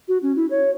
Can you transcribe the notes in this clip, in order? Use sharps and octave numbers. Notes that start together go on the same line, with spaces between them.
F#4
C#4
E4
C#5